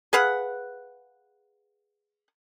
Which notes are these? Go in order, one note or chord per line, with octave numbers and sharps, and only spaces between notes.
G#4 B4 F5 F#5